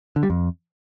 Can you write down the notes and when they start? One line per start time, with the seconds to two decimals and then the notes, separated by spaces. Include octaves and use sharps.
0.16 D3
0.23 G3
0.30 F2